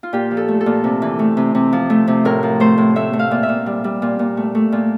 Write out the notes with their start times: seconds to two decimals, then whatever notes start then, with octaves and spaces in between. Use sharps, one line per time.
0.03 F4
0.13 A#2 G4
0.31 F3
0.37 A4
0.48 A3
0.61 A4
0.66 A#2
0.84 C3
1.02 E3
1.19 A3
1.37 C3
1.55 C3
1.72 F3
1.90 A3
2.07 C3
2.25 A2 A#4
2.43 F3
2.60 A3 C5
2.78 A2
2.96 A3 E5
3.13 A3
3.19 F5
3.31 A#2
3.43 E5
3.49 A#2
3.66 G3
3.84 G3
4.02 A#2
4.19 A#2
4.37 A3
4.55 A3
4.72 A#2